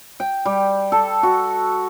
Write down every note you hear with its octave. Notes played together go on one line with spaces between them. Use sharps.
G5
G3
A4
F#4